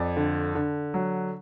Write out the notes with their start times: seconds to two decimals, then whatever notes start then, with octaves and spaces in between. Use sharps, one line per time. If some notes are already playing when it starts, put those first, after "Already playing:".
Already playing: F2 D5
0.17 D3
0.55 D3
0.94 F#3